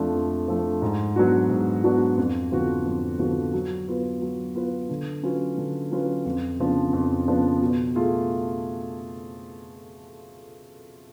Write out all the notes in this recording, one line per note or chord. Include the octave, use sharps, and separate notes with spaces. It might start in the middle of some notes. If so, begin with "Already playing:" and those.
Already playing: F2 F3 A3 D4
F2
F3 A3 D4
G#2
F#3 B3 D4 F#4
G#2
F#3 B3 D4 F#4
F2
D3 F3 B3 F#4
F2
D3 F3 B3 F#4
F#3
B3 F4 B4
F#3
B3 F4 B4
D3
F#3 C#4 F4 B4
D3
F#3 C#4 F4 B4
F2
C#3 F3 B3 D4
F2
C#3 F3 B3 D4
B2
A3 F4 G#4